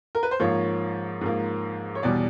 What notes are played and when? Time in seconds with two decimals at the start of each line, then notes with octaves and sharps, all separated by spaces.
0.15 A#4
0.23 B4
0.31 C5
0.40 G#2 F3 A#3 C#5
1.21 G#2 F3 A#3
1.95 C#5
2.03 E2 B2 G3 D5